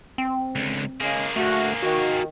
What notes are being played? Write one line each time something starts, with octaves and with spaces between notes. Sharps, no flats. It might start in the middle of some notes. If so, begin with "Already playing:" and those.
C4
C#2 D3
C#3 G#3 A#3 G#4
D2 A3 F#4
D#3 F#4